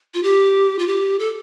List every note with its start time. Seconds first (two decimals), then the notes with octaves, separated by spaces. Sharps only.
0.14 F4
0.23 G4
0.79 F4
0.87 G4
1.19 A4